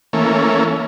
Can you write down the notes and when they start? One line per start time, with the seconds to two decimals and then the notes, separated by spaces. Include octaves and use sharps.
0.13 E3 A3 A#3 C#4